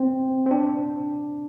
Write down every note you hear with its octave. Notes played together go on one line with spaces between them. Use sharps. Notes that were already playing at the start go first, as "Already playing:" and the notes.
Already playing: C4
C4
D4